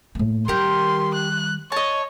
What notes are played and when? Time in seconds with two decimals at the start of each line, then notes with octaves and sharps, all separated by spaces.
0.15 A2 A#3
0.48 D#3 G3 G4 A#4 C6
1.14 F#6
1.72 C#5 D#5 A5